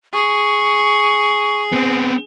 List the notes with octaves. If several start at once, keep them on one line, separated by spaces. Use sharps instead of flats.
G#4 C#6
B3 C4